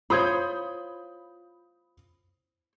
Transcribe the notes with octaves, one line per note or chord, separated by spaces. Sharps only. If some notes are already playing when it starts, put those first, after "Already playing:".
F4 C5 C#5 B5 D#6 G6